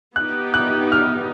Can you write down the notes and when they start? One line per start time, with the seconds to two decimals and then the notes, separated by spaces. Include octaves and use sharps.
0.16 B3 D#4 G4 F#6
0.54 F#6
0.92 F6